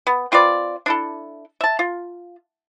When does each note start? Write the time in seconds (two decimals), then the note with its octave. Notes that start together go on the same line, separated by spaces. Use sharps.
0.07 B3
0.32 C4 F4 B4 D5
0.86 D4 E4 A4
1.61 E5 A5
1.79 F4